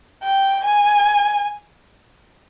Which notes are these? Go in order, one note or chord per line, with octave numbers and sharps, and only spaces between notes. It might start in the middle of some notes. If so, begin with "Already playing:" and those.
G5
G#5